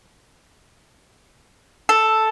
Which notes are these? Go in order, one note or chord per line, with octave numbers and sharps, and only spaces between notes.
A4